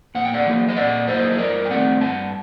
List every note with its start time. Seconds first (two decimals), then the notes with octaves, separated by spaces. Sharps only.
0.15 A#2 F#5
0.24 G5
0.33 D5 F#5
0.46 F#3 A#3
0.68 D#5
0.77 A#2 D5 F#5
1.07 F#3 A#3 C5 D#5
1.32 D#5
1.39 G2 A#4 D5
1.65 G5
1.70 D#3 A3 C4 D5 F#5
2.01 G2 F#5 A5